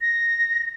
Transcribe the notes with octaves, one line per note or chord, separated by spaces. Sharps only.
A#6